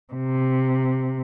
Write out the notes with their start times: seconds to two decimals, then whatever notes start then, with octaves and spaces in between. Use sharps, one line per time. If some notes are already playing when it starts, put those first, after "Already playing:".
0.14 C3